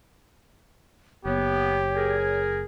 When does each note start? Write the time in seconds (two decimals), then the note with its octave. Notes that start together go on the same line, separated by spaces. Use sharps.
1.25 F#1 B3 G4 C#5
1.95 G#4 A#4 G#5